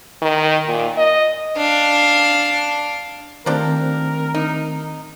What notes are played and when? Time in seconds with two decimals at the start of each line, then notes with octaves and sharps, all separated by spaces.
0.22 D#3
0.67 A#2
0.97 D#5
1.57 D4 F5
3.46 D#3 F3 A3 C4 D4 G4 A#4
4.34 D#4